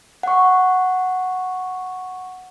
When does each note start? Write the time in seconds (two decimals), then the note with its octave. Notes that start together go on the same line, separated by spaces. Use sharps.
0.23 F#5 C#6